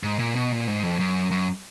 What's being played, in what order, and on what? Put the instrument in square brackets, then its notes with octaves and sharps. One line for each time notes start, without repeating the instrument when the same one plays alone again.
[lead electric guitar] G#2
A#2
B2
A#2
G#2
F2
F#2
F#2